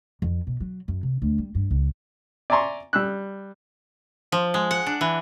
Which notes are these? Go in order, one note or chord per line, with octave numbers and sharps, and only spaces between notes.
F2
B2
F#3
F#2
C3
D2
G3
G2
C#2
D5 E5 G#5 A#5 C6 C#6
G3 E6 F#6
F3
G#3
F#5
D4
E3